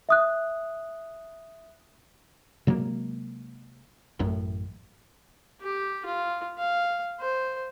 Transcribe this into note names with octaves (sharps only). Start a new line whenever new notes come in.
E5 D#6 F#6
C3 F#3 G#3 A#3
A1 F#2 A2
G4
F4
F5
C5